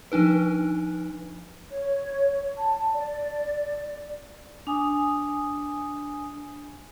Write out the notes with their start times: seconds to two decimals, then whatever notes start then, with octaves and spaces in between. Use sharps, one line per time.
0.12 F3 D4 D#4 B4
1.69 C#5
2.56 A5
2.92 D5
4.67 D4 G#5 D#6